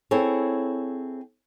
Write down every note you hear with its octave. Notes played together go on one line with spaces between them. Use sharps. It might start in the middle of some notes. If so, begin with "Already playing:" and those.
C4 E4 G#4 A4 C#5